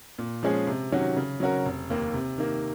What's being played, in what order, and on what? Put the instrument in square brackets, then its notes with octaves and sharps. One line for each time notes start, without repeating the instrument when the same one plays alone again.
[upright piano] A#2
F3 G#3 C#4 G#4
C3
D#3 F#3 C#4 F#4
C#3
F#3 C#4 F#4 A#4
F1
D#2 D#3 A#3
C3
D#3 A#3